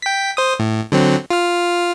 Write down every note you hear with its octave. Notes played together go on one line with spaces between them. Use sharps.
G5 B6
C5 D#6
A2
D3 F#3 C4
F4 F6